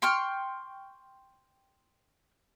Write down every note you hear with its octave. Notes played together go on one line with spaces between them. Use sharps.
G5 C6 C#6 F6